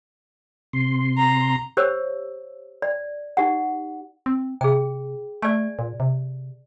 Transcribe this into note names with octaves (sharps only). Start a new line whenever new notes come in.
C3 C6
A#5
G4 C5 C#5 E6
D5
D#4 G4 F#5
C4
C3 G#4 G5
A3 D5 G#5
A#2
C3